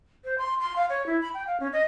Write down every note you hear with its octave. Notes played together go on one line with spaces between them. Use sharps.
C5
C6
C6
F5
C#5
E4
B5
G5
F5
C#4
D#5